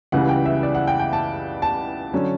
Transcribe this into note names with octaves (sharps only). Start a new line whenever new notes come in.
C#2 C#3 E3 G3 F#5
G5
E5
D5
F#5
G5
G5
A5
A5
D3 F#3 C#4